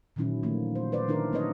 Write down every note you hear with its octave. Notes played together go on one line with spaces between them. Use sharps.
A#2 D3 D#3 F#3 C#4 E4
D#3 F3 A3 A#3
C5
B4 C5 D5
D3 D#3 D4 E4 A#4
F#3 A#3 C4 B4 C#5 D#5